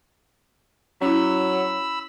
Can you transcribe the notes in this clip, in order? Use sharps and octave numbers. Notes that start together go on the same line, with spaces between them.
F#3 C#4 E4 B5 E6